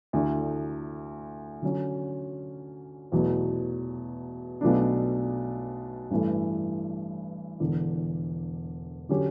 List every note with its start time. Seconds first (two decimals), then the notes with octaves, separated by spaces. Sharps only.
0.13 D2 D3 A3 E4
1.62 D3 F#3 C#4
3.12 E2 B2 F#3 A3
4.61 B1 B2 A3 D4
6.11 A1 G2 E3 A3
7.60 E1 E2 D3
9.09 D3 F#3 C#4 G4